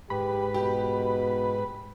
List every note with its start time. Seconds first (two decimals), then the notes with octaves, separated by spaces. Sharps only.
0.10 G#2 G4 B4 B5
0.54 B2 G4